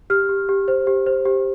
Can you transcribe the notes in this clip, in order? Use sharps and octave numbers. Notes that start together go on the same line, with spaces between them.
G4 F6
G4
G4
C5
G4
C5
G4